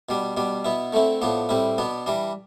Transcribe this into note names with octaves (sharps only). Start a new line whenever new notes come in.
B2 G3 D4
B2 G3 D4
B2 B3 E4
D3 A3 C4 E4
A2 F3 B3 D4
A2 G3 C4 E4
B2 B3 D4
E3 G3 D4